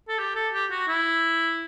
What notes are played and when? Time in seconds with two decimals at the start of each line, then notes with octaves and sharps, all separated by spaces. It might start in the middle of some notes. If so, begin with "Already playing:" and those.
0.08 A4
0.18 G4
0.36 A4
0.53 G4
0.71 F#4
0.88 E4